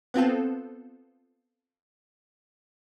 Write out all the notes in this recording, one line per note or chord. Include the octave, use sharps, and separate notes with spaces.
B3 C4 F4 A4